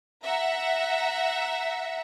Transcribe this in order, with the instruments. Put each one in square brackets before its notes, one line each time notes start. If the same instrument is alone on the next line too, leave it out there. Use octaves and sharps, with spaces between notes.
[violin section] E5 F#5 A#5